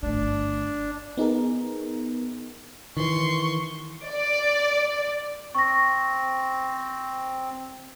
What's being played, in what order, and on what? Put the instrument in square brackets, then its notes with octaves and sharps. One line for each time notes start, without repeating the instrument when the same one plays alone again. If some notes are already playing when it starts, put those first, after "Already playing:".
[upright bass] G1 A3 [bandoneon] D4
[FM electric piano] B3 D#4 G#4 A#4
[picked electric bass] D#3 E3 [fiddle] C6 C#6
[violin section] D5
[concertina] C4 [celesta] C#6 A#6